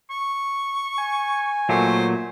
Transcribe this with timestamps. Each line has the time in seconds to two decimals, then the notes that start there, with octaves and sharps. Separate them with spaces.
0.10 C#6
0.98 G#5
1.69 A#2 F#3 A3 C5